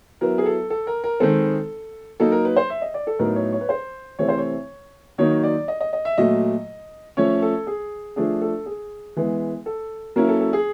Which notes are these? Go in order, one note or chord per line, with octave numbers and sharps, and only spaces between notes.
F#3 B3 E4 A#4
G#4
A4
A4
A#4
A#4
D#3 G#3 C4 A4
F#3 A#3 D#4 A4
A#4
B4
C5
E5
D#5
D5
A4
A2 F#3 B3 D#4 A#4
C#5
C#5
B4
C5
C3 E3 A3 C4 C#5
C5
C#5
D#3 F#3 A#3 D#4 C#5
D5
D#5
D#5
D#5
E5
A#2 F#3 A3 D#5
F3 A3 C#4 C#5
A4
G#4
F3 A3 D4 G#4
A4
G#4
E3 G#3 B3
A4
F#3 A#3 C#4 E4 A#4
A4
A4
G#4